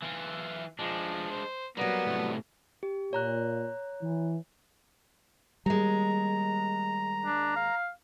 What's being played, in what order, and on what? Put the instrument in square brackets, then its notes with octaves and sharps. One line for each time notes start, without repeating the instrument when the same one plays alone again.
[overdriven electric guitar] E3 F4
[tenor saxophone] F3 [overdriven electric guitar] G#3 D4
[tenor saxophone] C5
[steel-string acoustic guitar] F#3 G3 [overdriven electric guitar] A#3 [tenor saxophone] B3
[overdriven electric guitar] A2 C3
[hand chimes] G4
[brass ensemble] A#2 [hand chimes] C#5 A#5 F#6
[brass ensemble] E3
[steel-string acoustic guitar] D#2 G#3 [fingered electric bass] G3 [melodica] A#5
[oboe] D4
F5